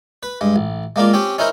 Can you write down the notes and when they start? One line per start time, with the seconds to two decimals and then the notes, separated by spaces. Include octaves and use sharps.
0.23 B4
0.41 G2 G#3
0.56 A1
0.96 G#3 A#3 D4 F4
1.13 C4 C#4 G4
1.38 C#4 D#4 E4 A#4 C5